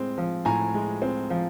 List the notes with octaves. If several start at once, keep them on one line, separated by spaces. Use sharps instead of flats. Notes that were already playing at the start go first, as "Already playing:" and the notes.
Already playing: A2 G#3 C4
F3
A2 G#5 A#5
G#3
C4
F3